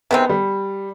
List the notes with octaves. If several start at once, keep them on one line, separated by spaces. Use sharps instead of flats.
C3 D#3 G#3 B3 C4
G3